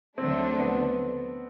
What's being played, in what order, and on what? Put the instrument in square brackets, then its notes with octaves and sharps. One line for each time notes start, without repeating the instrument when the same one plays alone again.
[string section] D2 D3 F#3 A3 D4 [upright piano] C4
[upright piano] B3